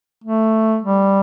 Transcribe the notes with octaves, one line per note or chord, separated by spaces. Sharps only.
A3
G3